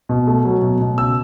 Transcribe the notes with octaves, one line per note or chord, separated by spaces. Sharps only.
B2
A3
F#3
B2
B2
C#3 E6